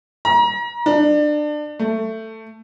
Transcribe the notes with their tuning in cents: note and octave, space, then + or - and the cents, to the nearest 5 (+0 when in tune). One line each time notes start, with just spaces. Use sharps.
A#5 +30
D4 +25
A3 +15